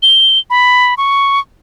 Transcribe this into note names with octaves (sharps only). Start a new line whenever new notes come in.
G7
B5
C#6